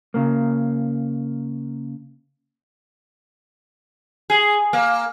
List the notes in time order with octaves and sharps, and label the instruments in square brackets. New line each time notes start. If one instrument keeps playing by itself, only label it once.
[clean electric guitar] C#3 A#3
[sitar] G#4
A#3